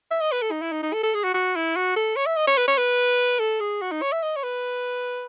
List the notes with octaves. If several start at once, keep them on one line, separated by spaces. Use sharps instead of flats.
E5
D#5
B4
A4
D#4
E4
D#4
D#4
A4
A4
G#4
F#4
F#4
E4
F#4
A4
C#5
E5
D#5
C#5
B4
C#5
B4
A4
G#4
F#4
D#4
C#5
E5
D#5
C#5
B4